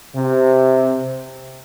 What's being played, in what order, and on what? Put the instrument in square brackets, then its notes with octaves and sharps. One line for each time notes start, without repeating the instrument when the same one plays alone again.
[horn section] C3